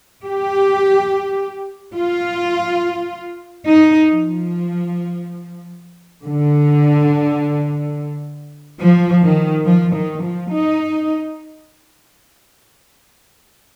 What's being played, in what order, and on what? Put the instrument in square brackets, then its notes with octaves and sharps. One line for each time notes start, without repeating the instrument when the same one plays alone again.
[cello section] G4
F4
D#4
F3
D3
F3
D#3
F3
D#3
F3
D#4